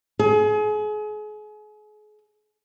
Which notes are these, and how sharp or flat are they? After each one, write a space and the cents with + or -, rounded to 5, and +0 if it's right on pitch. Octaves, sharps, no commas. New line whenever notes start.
G#4 +35